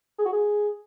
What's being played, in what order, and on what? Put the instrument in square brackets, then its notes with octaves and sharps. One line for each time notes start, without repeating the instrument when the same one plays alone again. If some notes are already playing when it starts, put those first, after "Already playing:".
[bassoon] G#4
F#4
G#4